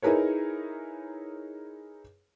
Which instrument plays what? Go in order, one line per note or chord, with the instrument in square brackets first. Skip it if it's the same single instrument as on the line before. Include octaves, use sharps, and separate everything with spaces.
[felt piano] D#4 E4 G#4 A#4 B4 C#5